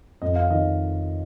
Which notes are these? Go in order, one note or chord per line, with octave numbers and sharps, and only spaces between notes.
F2 D#5
F5
D#3 D#5